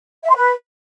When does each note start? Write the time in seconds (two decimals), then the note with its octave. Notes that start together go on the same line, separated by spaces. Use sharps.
0.24 E5
0.30 C6
0.36 B4